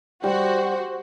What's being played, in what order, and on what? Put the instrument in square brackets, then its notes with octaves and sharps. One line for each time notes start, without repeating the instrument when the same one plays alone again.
[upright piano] G3 [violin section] F#4 [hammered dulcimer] G4 [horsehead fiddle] C5